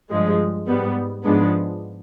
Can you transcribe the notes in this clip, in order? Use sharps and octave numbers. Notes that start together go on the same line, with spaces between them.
G2 F3 G#3
G#2 G3 B3
G#2 F3 G#3 B3 D4